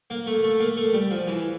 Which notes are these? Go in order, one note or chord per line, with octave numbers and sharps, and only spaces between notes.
A#3
A3
A3
A#3
A3
G3
F3
E3